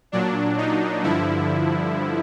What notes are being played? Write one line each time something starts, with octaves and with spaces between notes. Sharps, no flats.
A#2 F#3 D4
D#4
G2 D3 F3 E4